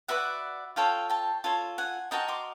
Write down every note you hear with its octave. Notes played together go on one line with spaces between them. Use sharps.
F#4 B4 D5 E5 F#5
F4 A4 C#5 F5 G5
G5 A5
F4 A4 C#5
F#5 G#5
F#4 A#4 D#5 G5 A5
C6 D6